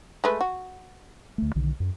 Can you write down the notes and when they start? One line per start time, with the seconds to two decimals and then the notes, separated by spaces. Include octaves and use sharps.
0.24 G#3 A3 B4
0.41 F#4
1.38 D2 A3
1.55 B1 D3 D#3
1.80 F#2